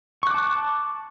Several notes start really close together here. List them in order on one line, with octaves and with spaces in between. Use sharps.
C#6 F#6 D6 A5